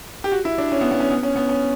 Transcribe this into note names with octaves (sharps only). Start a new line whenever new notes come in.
G4
F#4
E4
D4
C#4
B3
B3
C#4
B3
C#4
B3
C#4